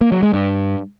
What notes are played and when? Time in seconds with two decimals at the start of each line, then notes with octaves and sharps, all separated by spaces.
0.01 A#3
0.12 F#3
0.23 G#3
0.33 G2